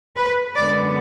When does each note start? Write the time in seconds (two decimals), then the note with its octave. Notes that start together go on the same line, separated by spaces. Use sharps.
0.17 B4
0.54 F#2 D3 G#3 B3 D5